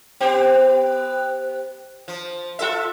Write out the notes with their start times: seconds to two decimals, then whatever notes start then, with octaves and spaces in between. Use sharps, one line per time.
0.20 B3 G4 C5
2.08 F3
2.59 F4 A4 E5